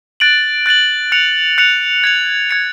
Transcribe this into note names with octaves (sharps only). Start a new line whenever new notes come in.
F#6 A6 D7 F#7
F#6 A6 D7 F#7
F#6 C#7 F7
F#6 C#7 F7
G#6 C#7 F7
G#6 C#7 F7